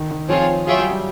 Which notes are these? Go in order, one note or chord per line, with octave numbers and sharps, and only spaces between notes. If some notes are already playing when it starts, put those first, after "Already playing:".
Already playing: D#3
D#3
F3 C4 F4 G#4 C#5
F#3 F4 G#4 C#5 E5 G5
G3
G3